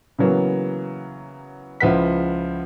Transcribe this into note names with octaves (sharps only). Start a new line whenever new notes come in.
C#3 E3 F#3 A#3 B3
C#2 F3 E4 B4 F#5 B6